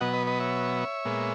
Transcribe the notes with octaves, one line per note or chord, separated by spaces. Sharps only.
B2 F#3 B3 D#5 F#5
B4 D#5
B4 D#5
C#5 E5
A#2 G#3 B3